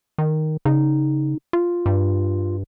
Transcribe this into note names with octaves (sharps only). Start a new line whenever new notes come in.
D#3
C#3 D#4
F4
G2